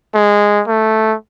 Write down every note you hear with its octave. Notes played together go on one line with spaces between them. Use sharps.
G#3
A3